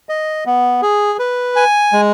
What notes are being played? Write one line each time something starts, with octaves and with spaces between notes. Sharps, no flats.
D#5
B3
G#4
B4
G#5
G#3